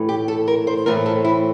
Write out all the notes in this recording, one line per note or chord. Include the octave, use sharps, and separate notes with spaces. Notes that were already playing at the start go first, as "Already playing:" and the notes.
Already playing: A2 E3 A3
G4
A4
A#4
C5
A2 E3 A3 C4 A#4
A4
E4